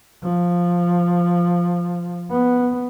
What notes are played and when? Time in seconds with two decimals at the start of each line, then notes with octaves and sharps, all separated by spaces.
0.23 F3
2.30 B3